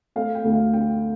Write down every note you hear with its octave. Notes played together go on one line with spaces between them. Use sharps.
A3 F5
G5
D2
F5
D3 G5